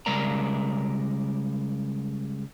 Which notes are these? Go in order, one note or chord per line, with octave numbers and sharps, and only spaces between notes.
C#3 G3 G#3 A#4 D5 A#5